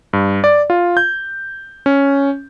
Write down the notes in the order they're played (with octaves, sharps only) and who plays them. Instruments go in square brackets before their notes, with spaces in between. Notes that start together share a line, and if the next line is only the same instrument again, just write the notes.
[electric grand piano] G2
D5
F4
G6
C#4